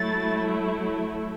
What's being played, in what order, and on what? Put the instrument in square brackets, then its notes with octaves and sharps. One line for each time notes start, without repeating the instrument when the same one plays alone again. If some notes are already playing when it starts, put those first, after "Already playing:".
Already playing: [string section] F#3 A3 E4 A6